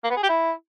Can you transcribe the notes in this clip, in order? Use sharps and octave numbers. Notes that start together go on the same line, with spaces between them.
A#3
B3
G#4
G4
E4